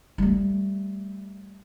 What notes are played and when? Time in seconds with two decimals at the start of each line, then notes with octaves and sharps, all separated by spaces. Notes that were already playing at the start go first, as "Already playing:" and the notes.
0.18 G3 A3